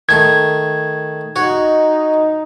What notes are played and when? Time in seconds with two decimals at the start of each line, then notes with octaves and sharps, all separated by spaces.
0.09 D#3 A3 C6 G#6
1.36 D#4 F#4 C#5